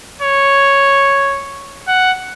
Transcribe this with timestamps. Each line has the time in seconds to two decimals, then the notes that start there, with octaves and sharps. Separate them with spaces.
0.22 C#5
1.88 F#5